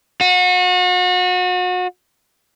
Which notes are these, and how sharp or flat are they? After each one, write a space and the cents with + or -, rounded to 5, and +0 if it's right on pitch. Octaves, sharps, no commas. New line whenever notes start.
F#4 -35